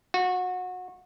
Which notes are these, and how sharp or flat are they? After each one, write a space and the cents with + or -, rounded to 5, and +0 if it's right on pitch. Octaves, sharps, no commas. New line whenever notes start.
F#4 -25